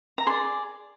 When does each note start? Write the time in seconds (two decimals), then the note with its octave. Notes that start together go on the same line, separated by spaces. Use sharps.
0.18 A#5
0.27 G#4 C6
0.30 D5